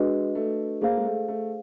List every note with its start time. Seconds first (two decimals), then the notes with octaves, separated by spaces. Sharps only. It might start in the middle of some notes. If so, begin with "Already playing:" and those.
Already playing: G#3 D4 F#4 B4 D#5
0.35 A3
0.82 A#3 G#4 C5 F5
0.97 G#3
1.05 A3
1.28 A3